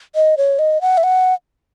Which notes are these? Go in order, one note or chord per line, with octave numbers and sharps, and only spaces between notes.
D#5
C#5
D#5
F#5
E5
F#5